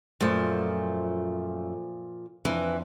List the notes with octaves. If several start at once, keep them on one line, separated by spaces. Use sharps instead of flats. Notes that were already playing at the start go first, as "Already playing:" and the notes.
F#2 A#2 F3 A3 B4
F2 E3 D4 B4